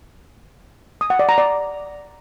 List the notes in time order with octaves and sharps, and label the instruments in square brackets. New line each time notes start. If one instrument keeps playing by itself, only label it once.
[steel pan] D#6
F#5
D5
A#5
D5